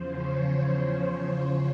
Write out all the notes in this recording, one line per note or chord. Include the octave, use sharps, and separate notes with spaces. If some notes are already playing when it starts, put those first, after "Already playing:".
Already playing: E2 C#3 F3 C5
C#5
C#5